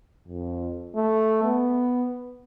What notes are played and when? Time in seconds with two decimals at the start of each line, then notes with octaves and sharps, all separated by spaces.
0.28 F2
0.96 A3
1.44 B3